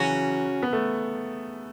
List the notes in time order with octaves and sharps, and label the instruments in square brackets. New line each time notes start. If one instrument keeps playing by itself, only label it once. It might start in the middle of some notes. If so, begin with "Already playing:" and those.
Already playing: [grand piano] C#3 E3 F#3 [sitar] C#4 F#4
[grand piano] B3
A3